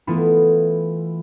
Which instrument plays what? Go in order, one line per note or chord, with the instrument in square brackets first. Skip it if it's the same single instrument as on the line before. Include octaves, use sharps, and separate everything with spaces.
[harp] E3 A3 B3 E4 F4